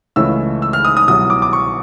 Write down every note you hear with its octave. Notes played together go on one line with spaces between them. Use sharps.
C#2 C#3 E3 A3 C#4 E6
E6
F6
D#6
D#6
C2 B2 F#3 D#6
D6
D6
C#6